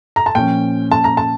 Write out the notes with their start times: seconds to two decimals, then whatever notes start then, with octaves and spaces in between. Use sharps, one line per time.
0.16 A#5
0.26 A5
0.35 A#2 F3 C#4 G5
0.92 A5
1.04 A#5
1.17 A5